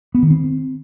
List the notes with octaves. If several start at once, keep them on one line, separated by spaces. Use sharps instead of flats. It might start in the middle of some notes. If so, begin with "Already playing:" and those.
B3
D#3
C4